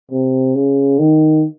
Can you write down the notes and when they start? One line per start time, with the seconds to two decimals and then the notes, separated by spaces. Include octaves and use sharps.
0.11 C3
0.55 C#3
0.99 D#3